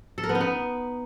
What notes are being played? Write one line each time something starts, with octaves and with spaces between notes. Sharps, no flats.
A4
A#4
B3
D#4
B3